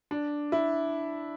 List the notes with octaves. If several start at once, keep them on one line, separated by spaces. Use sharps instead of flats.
D4
E4